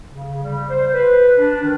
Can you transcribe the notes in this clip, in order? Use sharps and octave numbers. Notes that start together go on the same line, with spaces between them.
C#3
G3
C5
B4
D4
D#3